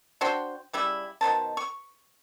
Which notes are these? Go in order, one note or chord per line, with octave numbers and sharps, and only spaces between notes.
D4 F#4 C5 G5
C#3 G3 E4
B2 D#3 C5 A5
C#6